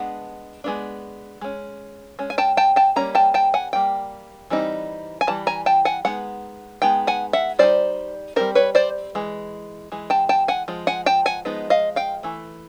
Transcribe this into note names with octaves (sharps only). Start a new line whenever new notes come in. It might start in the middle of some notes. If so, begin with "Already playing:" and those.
Already playing: G#3 B3 D4 F#5
G#3 B3 D4
G#3 C#4
G#3 C#4
G#5
G5 A5
G5 A5
G5 A5
G3 A#3 C#4 A#5
G5 A5
G5 A5
F#5 G#5
G3 A#3 G5
E3 G3 C4 D#4
G#5
E3 G3 A5
G#5 A#5
G5 A5
F#5 G#5
G#3 B3 D#4 F#5
G#3 B3 D#4 G5
F#5 G#5
E5 F#5
G3 C4 D#4 C5 D5
G3 C4 D#4 A#4 C5
B4 C#5
C5 D5
E3 G#3
E3 G#3
G5 A5
G5 A5
F#5 G#5
F3 G#3
F#5 G#5
G5 A5
F#5 G#5
F3 G#3 B3 D#4
D#5 F5
F5 G5
E3 A3